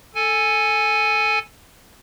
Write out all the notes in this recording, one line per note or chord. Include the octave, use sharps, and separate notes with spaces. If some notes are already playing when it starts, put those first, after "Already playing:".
A4 G#5